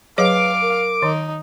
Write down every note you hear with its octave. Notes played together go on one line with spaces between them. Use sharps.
F#3 G#4 B4 C#5 F5 D6
A#4
D#3 D#4